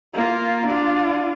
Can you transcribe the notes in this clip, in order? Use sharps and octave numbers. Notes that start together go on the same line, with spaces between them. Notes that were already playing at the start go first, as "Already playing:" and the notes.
A#3 F4
D4 F4